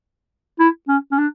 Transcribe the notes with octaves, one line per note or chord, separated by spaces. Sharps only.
E4
C#4
C#4
D4